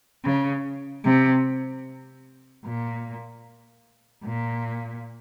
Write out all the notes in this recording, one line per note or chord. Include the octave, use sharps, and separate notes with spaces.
C#3
C3
A#2
A#2